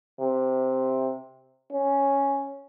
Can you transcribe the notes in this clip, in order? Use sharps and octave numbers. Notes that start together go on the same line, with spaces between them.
C3
C#4